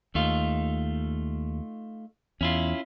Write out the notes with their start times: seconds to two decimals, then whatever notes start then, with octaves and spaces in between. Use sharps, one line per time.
0.15 D#2 A3 D#4 F4
2.41 E2 C#4 E4 F4